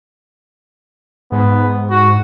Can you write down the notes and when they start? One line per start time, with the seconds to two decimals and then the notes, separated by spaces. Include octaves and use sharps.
1.32 G#2 B3
1.90 F#4